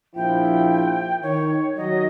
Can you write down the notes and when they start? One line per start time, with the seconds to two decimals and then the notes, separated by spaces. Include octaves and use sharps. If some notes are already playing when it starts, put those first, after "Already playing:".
0.15 A#1 F3 E4 G5
1.23 D#3 C#5
1.76 D#3 F#3 D#5